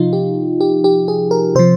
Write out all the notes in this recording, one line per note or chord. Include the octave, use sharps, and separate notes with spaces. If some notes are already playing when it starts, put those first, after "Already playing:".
Already playing: C3 F3 D#4 F4
G4
G4
G4
G#4
A#4
C3 F3 C5